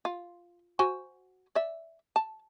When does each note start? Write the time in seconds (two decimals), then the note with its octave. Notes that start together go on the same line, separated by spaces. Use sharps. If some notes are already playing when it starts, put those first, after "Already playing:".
0.05 F4
0.79 F#4 C5 G#5
1.55 D5 E5
2.16 A5